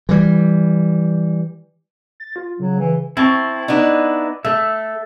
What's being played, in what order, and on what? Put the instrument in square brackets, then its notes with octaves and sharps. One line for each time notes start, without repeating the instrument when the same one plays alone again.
[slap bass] E3 G3
[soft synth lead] A6
F4
[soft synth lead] C#3 [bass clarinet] F#3
[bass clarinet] E3
[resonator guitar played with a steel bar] C4 [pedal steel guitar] E4 A5 C#6
[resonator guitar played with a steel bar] B3 D4 D#4
[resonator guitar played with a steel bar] A3 [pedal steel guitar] A4 E5